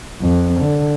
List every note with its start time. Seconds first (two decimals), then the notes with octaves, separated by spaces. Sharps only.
0.22 F2
0.60 D3